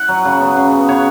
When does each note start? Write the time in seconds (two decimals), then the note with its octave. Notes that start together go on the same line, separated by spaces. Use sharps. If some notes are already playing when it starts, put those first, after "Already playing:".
Already playing: E5 F#5
0.08 F#3
0.25 C#3
0.41 B3
0.56 C#3
0.72 B3
0.88 C#3 C#5